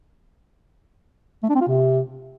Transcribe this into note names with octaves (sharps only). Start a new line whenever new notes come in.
A3
D4
C4
F4
C3